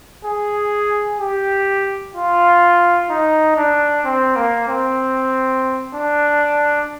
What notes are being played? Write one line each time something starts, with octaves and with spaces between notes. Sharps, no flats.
G#4
G4
F4
D#4
D4
C4
A#3
C4
D4